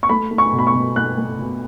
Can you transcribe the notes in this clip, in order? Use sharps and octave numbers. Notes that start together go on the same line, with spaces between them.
C#6
A3 B5
A3
C#6
B2
B5
C#6
B2
A3 F#6
A3
B2